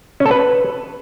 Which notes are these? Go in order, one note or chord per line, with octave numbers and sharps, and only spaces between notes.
C#4
A4
B4